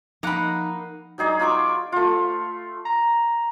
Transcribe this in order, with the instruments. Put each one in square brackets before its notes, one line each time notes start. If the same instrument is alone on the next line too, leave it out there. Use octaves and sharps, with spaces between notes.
[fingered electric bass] F3 [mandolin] A#3 F#5 [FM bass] D#4 [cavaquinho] A#5 B5
[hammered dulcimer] F#3 D#4 G#4 D5
F4 B5 C#6 D6
[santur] A3 F4
[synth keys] A#5